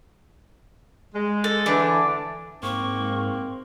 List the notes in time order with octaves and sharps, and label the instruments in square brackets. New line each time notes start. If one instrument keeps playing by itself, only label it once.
[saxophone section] G#3
[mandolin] A4
[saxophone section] D3 E3 [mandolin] A3 D4 E4
[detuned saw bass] G#2 [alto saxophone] A#3 [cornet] C4 [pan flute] C#6